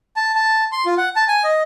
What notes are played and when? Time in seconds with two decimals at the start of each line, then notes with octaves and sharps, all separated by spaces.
0.16 A5
0.35 A5
0.72 C6
0.86 F4
0.98 F#5
1.16 A5
1.28 G#5
1.44 D#5